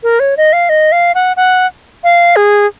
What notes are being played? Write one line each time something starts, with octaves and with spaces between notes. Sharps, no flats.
A#4
C#5
D#5
F5
D#5
F5
F#5
F#5
F5
G#4